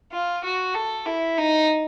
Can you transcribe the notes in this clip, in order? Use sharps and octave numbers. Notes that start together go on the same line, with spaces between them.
F4
F#4
A4
E4
D#4